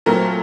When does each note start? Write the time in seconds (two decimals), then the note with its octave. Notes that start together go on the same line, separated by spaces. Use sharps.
0.06 A#2 F#3 A3 C4 A#4